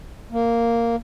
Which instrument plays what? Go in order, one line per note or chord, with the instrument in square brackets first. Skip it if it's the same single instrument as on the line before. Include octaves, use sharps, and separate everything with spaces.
[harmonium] A#3